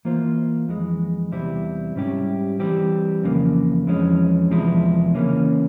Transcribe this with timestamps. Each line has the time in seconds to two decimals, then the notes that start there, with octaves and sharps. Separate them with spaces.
0.05 E3 A#3 F4 C5
0.68 F2 E3 G#3
1.32 E2 C3 G3 C4 E4
1.95 G#2 G3 C#4 E4 G4
2.59 E3 G3 C4 G4
3.23 F2 C#3 E3 A#3
3.87 F2 E3 G#3 C#4
4.50 E2 C3 F3 G#3 E4
5.15 C#3 E3 A#3 C#4